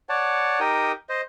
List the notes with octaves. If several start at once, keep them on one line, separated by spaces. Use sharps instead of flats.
C#5 D5 F#5 A5
D#4 G4 A#4 G5 D#6
C5 D#5